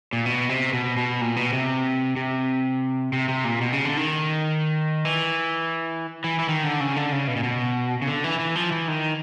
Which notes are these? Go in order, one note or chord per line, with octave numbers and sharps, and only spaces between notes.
A#2
B2
C3
B2
B2
A#2
B2
C3
C3
C3
C3
A#2
B2
C#3
D3
D#3
E3
E3
E3
D#3
D3
C#3
D3
C#3
B2
A#2
B2
C#3
D3
E3
E3
F3
E3
D#3